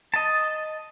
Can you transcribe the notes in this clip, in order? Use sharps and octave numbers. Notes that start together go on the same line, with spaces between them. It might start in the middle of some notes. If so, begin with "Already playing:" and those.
D#5 A5